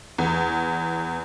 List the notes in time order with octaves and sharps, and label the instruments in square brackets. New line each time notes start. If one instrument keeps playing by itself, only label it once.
[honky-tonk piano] E2